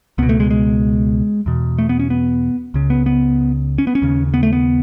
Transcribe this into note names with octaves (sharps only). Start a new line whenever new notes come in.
C#2 B2 B3
A3
G#3
G#3
E2 B2
A3
B3
C#4
B3
C#2 C#3
B3
B3
C#4
B3
C#4
D#2 C#3
B3
A3
B3